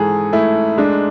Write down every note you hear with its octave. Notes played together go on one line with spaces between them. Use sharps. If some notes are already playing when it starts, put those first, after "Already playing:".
Already playing: G#2 E3 G#4 A4
A3 E4
G#3 D4